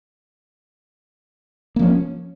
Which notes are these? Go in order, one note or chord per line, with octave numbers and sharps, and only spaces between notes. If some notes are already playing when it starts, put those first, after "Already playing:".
F3 A#3 C#4